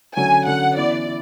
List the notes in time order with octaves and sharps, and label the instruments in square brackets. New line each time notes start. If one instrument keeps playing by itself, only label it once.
[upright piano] D3 F#3 C#4 [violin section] G#5
[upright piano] D3 F#3 C#4 [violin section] F#5
[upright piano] E3 B3 E4 [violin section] D5
[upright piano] E3